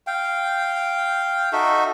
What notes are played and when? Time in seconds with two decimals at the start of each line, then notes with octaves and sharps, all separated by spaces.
0.07 F5 G5
1.53 D#4 F#4 A4 E5